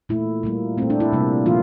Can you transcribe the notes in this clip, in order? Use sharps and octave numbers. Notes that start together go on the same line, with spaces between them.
A#2 A3 E4
A#2 G3 A#3
A#2 A3 C4
D4
E4
C3 G3 A#3
A#2 F3 A#3 F4